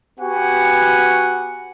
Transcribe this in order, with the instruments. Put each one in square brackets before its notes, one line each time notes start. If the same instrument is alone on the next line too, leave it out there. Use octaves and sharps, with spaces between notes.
[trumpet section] B3 F#4 G4 F#5 G#5